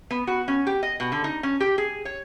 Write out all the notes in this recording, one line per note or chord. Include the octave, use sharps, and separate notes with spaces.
B3
F#4
C#4
G4
D#5
B2
D3
D#4
C#4
G4
G#4
C#5